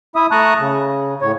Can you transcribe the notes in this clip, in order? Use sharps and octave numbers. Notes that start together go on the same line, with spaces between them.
E4 E5 D#6
A3 A5 A#5 C#6 D#6 F#6
C#3
A2 C#5